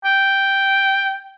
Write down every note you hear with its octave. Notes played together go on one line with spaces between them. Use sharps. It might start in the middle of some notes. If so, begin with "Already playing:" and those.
G5